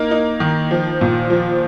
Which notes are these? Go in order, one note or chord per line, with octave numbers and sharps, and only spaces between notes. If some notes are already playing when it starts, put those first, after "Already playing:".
Already playing: A#3 D#4 A#4
D#4
D#3
F3
A#2
F3